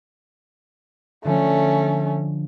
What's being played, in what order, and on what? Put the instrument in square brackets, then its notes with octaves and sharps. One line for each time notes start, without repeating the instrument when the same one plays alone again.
[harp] D3 F3 [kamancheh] A3 C#4